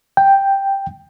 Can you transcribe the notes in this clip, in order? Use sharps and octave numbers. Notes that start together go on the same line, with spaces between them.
G5